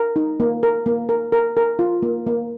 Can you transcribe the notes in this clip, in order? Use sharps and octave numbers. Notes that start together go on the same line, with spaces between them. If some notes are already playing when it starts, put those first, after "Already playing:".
Already playing: A#4
D#4
A#3
A#4
A#3
A#4
A#4
A#4
F4
A#3
A#3